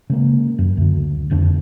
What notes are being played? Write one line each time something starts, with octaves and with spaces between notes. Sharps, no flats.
C#3 G#3 A#3
F#2
D2 D3
D1 F2 D3 D4